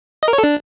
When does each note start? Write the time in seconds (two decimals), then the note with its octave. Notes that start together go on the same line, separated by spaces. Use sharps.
0.23 D#5
0.28 A#4
0.33 C#5
0.38 A4
0.44 D4